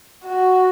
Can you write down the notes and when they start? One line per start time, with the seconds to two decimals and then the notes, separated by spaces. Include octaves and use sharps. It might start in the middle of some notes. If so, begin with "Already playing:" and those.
0.25 F#4